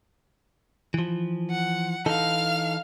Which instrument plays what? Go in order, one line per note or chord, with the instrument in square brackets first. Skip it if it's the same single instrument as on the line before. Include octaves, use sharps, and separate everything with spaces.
[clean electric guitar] E3 F3
[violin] F#5
[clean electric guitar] E3 D#4 A4 [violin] F5 F6